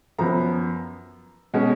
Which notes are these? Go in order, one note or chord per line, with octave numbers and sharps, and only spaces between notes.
F#2 F3 B3 A#5
B2 G#3 C#4